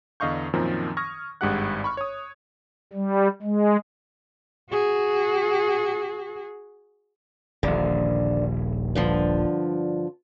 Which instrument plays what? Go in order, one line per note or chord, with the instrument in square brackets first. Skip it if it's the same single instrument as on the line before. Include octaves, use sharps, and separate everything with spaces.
[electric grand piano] E2 D3 D#5 F5 C#6 G6
F#2 A#2 D#3 F3 C4
C#6 D#6 F6 G#6 A#6
G#1 G2 G#3 G4 F#5 F#6
B5 C#6 F6
C#5 D#6
[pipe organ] G3
G#3
[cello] F#4 G#4
[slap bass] D#1 A#1 [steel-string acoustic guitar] D3
[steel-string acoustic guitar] G2 D3 F3